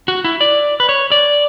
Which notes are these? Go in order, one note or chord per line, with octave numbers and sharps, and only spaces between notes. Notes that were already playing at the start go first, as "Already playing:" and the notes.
F#4
E4
D5
B4
C#5
D5